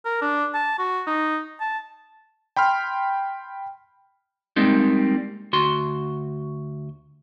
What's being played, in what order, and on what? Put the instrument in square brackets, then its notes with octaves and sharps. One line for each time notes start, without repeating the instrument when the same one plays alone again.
[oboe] A#4
D4
A5
F#4
D#4
A5
[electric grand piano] G5 B5 C6 F6
[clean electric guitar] G3 G#3 A#3 C4 D#4
D2 F#4 C6